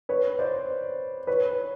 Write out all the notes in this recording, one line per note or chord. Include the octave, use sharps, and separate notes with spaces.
B4 C#5
C5 D5
B4 C#5